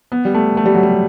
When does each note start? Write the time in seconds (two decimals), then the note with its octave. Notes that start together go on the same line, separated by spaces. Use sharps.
0.12 B3
0.25 G3
0.35 A3
0.57 A3
0.66 G3
0.74 F#3
0.83 G3